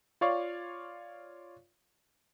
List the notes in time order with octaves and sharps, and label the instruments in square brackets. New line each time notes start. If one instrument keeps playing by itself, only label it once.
[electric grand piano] F4 C#5 D5 F5 C#6